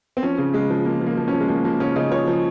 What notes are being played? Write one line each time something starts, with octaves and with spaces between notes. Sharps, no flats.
C4
F3 C#4
C#3
C#3 G#3
F3
F3 A#3
F3
A#3
F3
F3 C#4
G#3
F3 A#3
F3 A#3
C#3 C#4
C#3 D#4
F3 C#5
F3